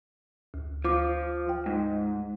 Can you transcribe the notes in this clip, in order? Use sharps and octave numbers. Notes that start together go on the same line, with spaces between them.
D2
F3 F4 D6
G5
G#2